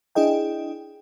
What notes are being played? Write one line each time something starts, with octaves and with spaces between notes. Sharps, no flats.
D4 E4 G#4 D#5 G5